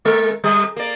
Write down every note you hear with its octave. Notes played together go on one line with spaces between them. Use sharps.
G#3 A#4
G3
A#3 D5